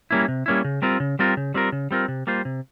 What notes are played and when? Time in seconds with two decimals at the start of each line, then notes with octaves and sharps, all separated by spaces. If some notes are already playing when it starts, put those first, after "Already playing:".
0.11 G3 A#3 C#4 E4
0.28 C3
0.46 G3 A#3 C#4 E4
0.64 C#3
0.82 G3 C4 F4 A#4
1.00 C#3
1.19 G3 C4 F4 A#4
1.37 C#3
1.54 G3 C4 F4 A#4
1.72 C#3
1.91 G3 C4 F4 A#4
2.08 C3
2.27 G3 A#3 F4 C5
2.45 C3